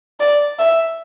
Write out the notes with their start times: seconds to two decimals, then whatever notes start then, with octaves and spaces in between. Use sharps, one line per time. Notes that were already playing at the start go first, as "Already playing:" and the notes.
0.20 D5
0.59 E5